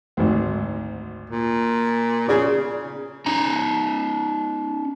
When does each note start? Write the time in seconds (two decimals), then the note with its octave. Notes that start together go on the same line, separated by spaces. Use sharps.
0.17 G#1 D2
1.30 A#2
2.28 C#3 G#4 D5
3.26 C#4 D#4 A#5